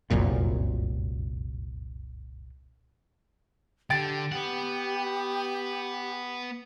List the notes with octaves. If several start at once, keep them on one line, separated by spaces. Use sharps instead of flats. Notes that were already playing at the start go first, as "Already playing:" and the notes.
F1 C2 F#2 A#2
D3 G4 G5 A6 D7
B3 G4 F#5